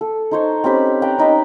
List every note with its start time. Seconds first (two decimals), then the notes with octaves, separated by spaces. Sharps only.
0.01 A4
0.31 D#4 C5 C#5
0.64 C4 C#4 G4 B5
1.02 B4 D5 G5 A#5
1.18 C#4 D#4 D5 B5